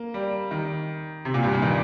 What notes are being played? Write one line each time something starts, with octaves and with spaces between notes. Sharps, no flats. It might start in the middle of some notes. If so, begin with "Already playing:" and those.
Already playing: A#3
G3
D#3
C3
A#2
G2
A#2
D#3